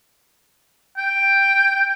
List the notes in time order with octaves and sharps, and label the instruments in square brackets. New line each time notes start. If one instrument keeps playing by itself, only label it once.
[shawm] G5